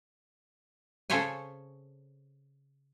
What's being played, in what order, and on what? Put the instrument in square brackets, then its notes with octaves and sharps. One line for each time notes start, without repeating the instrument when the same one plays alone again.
[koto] C#3 A4 C5 C#5 E5 G#5